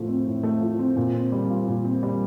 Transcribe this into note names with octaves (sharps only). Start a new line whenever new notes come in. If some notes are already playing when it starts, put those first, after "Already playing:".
Already playing: A2 F3 A3
C4
A2
A3
F3
C4
A#2
C4
G3
F4
A#2
C4
G3